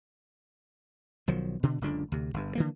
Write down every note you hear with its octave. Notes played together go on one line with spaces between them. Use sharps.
B1 D#3 F3 F#3
B2 D3
F#1 C#2 D3 D4
D2 C3
G1 G2
D3 E3 A#3